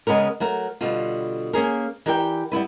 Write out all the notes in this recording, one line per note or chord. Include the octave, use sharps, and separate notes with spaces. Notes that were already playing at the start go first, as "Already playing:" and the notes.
C#3 G#3 B3 C#4 A#4
F#3 A3 A#4
B2 D3 G3 F4
A#3 C#4 G#4 A#4
E3 G4 A#4 D5 F5 G5
G3 B3 E4 B4